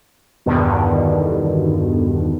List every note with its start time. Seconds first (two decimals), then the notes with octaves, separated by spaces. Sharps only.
0.46 E2 G2 B2 D3 D#3